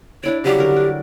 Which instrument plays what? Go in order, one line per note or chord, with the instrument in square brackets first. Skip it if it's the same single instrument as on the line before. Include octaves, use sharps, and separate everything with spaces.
[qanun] D4 E4 D5 [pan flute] C#5
[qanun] C#3 F#3 G3 [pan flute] G4
[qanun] D3 A#4
D4